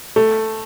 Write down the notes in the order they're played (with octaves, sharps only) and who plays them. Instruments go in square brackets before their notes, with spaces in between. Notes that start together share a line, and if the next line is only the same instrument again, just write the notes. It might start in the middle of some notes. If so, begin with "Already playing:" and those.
[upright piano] A3